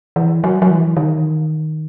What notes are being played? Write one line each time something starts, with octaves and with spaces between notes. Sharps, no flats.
E3
F#3
F#3
E3
D#3